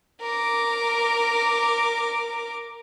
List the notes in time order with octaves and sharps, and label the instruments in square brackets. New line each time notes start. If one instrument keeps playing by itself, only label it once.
[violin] A#4 D6